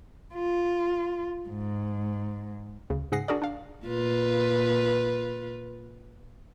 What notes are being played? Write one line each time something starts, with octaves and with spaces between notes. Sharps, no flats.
F4
G#2
D2 C#3
G#2 C#3 G#4 F#5 A#6 C7
D4 F#4 G#4 A#4 D5
D4 F5
A#2 F4 B4